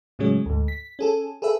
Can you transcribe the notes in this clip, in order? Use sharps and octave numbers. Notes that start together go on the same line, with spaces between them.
A2 C#3 F#3 G#3 C#4
D2 G#2
B6
C#4 G#4 A4
G#4 A4 B4 E5